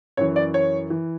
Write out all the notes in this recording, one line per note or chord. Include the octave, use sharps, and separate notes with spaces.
F#2 E3 C#5
D5
C#5
E3